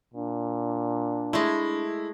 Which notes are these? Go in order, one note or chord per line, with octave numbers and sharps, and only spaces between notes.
A#2 D4
G#3 A3 E4